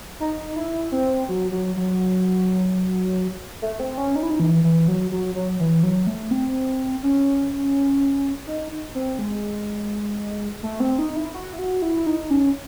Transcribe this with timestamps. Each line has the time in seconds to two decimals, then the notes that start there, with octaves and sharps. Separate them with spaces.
0.20 D#4
0.56 E4
0.92 C4
1.29 F#3
1.52 F#3
1.76 F#3
3.62 A3
3.79 C4
3.98 C#4
4.16 D#4
4.23 E4
4.30 D#4
4.40 E3
4.64 E3
4.88 F#3
5.12 F#3
5.35 F#3
5.60 E3
5.83 F#3
6.07 A3
6.31 C4
7.03 C#4
8.47 D#4
8.95 C4
9.19 G#3
10.63 A3
10.80 C4
10.99 D#4
11.16 E4
11.34 F#4
11.53 E4
11.59 F#4
11.82 E4
12.06 D#4
12.30 C#4